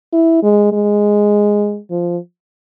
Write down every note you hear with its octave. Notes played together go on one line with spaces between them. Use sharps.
E4
G#3
G#3
F3